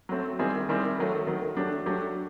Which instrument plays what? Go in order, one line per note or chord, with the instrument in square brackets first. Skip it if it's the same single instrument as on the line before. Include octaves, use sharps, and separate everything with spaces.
[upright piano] F#3 A3 C4
D#3 G3 C4 E4 G#4
D#3 G3 C4 E4 G#4
D#3 F#3 A3
D#3 F#3 A3
F#3 A3 D4 G4
F#3 A3 D4 G4